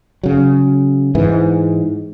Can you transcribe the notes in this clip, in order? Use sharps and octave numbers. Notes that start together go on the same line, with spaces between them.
C#3 F#3
G#2 E3